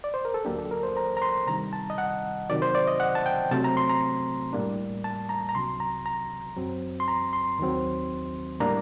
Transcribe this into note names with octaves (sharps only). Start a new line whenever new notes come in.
D5
C5
A#4
A4
D2 D3 F#3 A#3 D4 G4
A4
A#4
C5
A#5
A#5
C6
C3 D#3 G3 A#5
A5
D#5
F#5
C3 D#3 F#3 D5
C5
D5
D#5
F#5
A5
G5
C3 F#3 A3 C4 A5
A#5
C6
A#5
A2 G3 A#3 D4
A5
A#5
A#5
C2 C3 F#3 C6
A#5
A#5
F#2 F#3 C4
C6
A#5
C6
D#2 D#3 F#3 C4
A2 G3 A#3 D4 A#5